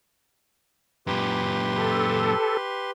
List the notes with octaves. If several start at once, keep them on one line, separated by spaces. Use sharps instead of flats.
F#2 A#2 G4 B4 C6
A4